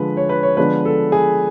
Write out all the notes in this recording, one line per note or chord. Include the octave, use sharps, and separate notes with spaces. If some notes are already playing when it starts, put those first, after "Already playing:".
Already playing: D3 F3 G#3 B4
C#5
B4
C#5
D3 F3 G#3 B3 D4 B4
A4
G#4